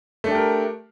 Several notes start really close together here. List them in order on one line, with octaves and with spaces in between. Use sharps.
A3 D4 G4 A#4